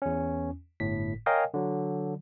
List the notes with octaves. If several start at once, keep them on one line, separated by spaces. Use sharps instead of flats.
E2 C#4
G1 A2 B6
A#4 C#5 D#5 F5 G5 G#5
D3 F#3